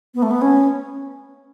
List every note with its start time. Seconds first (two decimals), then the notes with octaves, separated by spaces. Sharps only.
0.14 B3
0.22 A3
0.31 B3
0.42 C#4